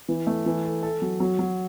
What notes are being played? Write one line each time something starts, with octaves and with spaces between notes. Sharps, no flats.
E3
A3
E3
A4
A4
F#3
F#3
F#3